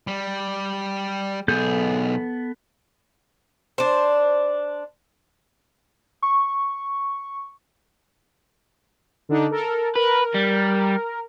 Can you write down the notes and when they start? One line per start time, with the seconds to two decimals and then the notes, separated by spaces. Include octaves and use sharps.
0.07 G3
1.48 B1 B3 G#4 A4 G6
3.78 D4 C5
6.23 C#6
9.29 D3 D4 D#4
9.51 A4 A#4
9.96 A#4 B4
10.35 G3